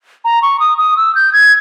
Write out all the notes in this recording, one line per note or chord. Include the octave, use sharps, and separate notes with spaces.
A#5
C#6
D#6
D#6
E6
G6
G#6